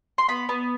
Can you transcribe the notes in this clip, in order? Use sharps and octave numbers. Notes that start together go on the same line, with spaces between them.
C6
B3 B5
B3